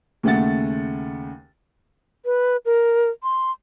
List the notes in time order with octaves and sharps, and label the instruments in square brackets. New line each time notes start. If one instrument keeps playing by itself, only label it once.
[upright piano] D#2 C#3 A3 F#5 A6
[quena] B4
A#4
C6